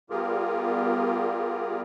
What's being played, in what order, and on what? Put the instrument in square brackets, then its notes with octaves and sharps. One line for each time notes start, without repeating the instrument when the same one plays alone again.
[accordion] G3 B3 F4 G4 G#4 A#4